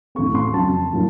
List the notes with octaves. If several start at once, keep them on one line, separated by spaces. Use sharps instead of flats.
A1 A2 A3 C4 C#6
C6
F2 C#3 F#3 A5
A2 F#3 A#3